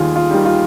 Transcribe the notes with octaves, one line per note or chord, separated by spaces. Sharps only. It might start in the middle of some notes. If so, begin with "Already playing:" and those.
Already playing: D#2 G3 F4 G#4
F4
D#3 G3
F4